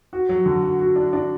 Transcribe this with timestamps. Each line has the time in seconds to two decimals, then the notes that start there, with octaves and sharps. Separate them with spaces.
0.13 F#4
0.29 F#3
0.46 D3
0.63 F#4
0.79 F#4
0.96 D4
1.13 D4